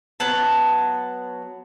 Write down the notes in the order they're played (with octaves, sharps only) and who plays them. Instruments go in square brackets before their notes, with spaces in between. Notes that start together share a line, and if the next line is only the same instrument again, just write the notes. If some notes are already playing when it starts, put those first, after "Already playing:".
[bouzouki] F#3 B3 F#5 A5